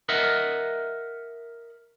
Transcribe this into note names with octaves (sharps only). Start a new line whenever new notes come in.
A#4 D#5 E5 F#5